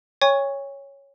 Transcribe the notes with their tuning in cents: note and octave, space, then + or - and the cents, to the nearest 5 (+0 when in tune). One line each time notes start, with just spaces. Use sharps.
C#5 +0 G#5 -40 C#6 +0